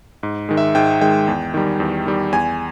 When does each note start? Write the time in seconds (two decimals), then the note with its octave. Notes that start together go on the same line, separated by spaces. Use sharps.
0.23 G#2
0.49 D#3 G#3
0.57 E5
0.75 G#2 G5
1.01 D#3 G#3 G5
1.28 E2
1.54 D#3 G3
1.80 E2
2.06 D#3 G3
2.33 E2 G#5